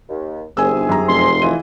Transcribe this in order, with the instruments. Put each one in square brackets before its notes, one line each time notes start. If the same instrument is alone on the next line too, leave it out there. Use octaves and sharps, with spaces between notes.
[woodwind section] D#2
[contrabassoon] F#1 [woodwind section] G#2 C3 G#4 [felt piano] G#5 E6
[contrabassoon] G1
[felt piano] F#2 A#5
[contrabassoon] F1 [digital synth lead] C6
[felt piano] E3 D#7 [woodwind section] F4 G#4 D#5